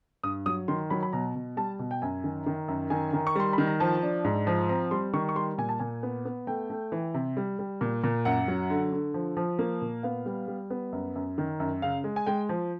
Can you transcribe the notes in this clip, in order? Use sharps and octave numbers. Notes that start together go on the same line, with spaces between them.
G2 D#6
F#3 D#6
D#3 C6
F#3 B5
B5
B2 A#5
B2
G3 A5
B2
G5
F#2 G#5
D#3
D#3
F#2
D#3 G#5
D#3
C#6
G3 C6
D#3 B5
A#5
F3 A5
D4
G#2
F3
C4 A#5
G3 C6
D#3 C#6
C#6
G3 C6
A#2 G#5
A5
A#2 G#5
B3
B3
A3 G5
A3
E3
C3
G3
G3
A#2
A#2
F#2 F#5
F#3
D3
D3
F3
F3
A#3
A#2
B3 F5
G3
G3
B3
F#2
F#2
D#3
F#2
C#3 F5
G#3
G#5
G#3 G5
F3